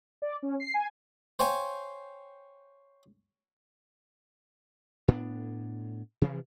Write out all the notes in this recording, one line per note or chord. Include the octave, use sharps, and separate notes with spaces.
D5
C#4
C7
G#5
C5 C#5 F5 G5 G#5
A2 B3 D4
C3 E3 F3